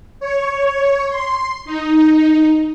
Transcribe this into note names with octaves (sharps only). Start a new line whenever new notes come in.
C#5
C6
D#4